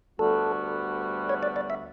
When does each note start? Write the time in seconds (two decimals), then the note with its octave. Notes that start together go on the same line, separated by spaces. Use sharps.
0.19 D2 D3 G3 B3 F#4 A4
1.30 C#5
1.43 D5
1.56 D5
1.70 E5